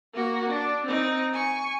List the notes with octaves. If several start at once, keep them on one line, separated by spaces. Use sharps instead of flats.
A#3 F#4
D4
C4 D#4
G#5 C#6